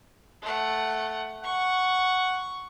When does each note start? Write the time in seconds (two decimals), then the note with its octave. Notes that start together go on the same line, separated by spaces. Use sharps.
0.42 A3 F#5
1.44 F#5 C#6